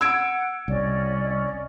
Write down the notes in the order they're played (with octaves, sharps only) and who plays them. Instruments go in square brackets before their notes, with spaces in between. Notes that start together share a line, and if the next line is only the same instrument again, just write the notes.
[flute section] F#5 [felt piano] E6 G#6 D7
[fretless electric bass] C2 [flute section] C#4 D5 D#5